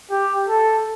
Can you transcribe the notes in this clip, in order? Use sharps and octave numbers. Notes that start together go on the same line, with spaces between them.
G4
A4